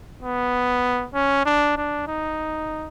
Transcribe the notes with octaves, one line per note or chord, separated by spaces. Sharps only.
B3
C#4
D4
D4
D#4